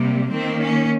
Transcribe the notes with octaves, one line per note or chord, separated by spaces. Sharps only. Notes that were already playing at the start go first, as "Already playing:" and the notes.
Already playing: C3 G3 A#3
D#3 A#3 C4
C#4